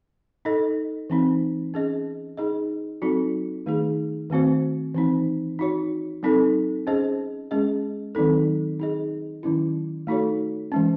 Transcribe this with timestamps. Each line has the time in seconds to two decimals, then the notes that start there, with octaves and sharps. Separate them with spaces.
0.45 D#4 A4 D#5
1.10 E3 C4 D#4
1.74 C#4 G#4 D#5
2.37 D#4 G#4 D#5
3.02 F#3 C4 D#4 F#4 A4
3.66 D#3 A3 D#4 G#4
4.30 D#3 A3 C4 F#4 C5
4.95 E3 C4 D#4
5.59 D#4 F#4 C#5
6.23 F#3 C4 D#4 A4
6.87 C#4 G#4 C5 D#5
7.51 G#3 C#4 G#4 D#5
8.15 D#3 F#3 C4 D#4 A4
8.79 D#4 G#4 D#5
9.43 D#3 F#3 C#4 E4
10.07 A3 D#4 F#4 A4 C#5
10.72 E3 G#3 C#4